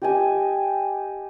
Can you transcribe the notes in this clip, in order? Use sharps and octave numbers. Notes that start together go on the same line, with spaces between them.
G4 D#5 G#5